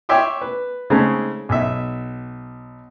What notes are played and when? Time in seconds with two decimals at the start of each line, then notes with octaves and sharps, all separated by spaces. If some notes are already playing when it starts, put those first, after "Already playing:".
0.09 C#5 E5 G5 C6 D6
0.41 B4
0.90 C#3 G#3 A3 C4 C#4 D#4
1.49 B1 E5